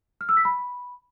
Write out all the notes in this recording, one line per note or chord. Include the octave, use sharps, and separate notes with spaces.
F6
E6
B6
B5